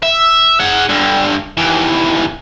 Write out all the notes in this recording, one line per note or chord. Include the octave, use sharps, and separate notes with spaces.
E5
G#4 F#5
G2 D3
D#2 E3